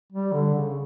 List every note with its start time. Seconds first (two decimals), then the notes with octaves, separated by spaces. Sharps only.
0.12 G3
0.33 D3
0.54 C#3